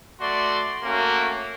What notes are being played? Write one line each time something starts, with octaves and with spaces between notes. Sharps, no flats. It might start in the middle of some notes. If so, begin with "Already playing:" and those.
A3 F#4 D5 C6
A3 A#3 C#4 F#4